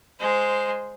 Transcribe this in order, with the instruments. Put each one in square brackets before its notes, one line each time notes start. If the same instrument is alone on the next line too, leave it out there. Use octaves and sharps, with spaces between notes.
[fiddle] G#3 C5